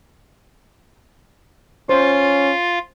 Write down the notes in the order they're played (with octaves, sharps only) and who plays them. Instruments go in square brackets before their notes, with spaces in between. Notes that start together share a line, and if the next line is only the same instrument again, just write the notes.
[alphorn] C#4 [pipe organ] F4 F5 [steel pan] C5